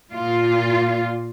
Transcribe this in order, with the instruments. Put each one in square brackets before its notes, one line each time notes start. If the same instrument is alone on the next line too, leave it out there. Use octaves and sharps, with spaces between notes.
[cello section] A#2 F4